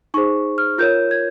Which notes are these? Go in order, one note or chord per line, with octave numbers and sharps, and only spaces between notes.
D#4 G#4 C5 C#6
F6
F4 A#4 C#5 G6
G#6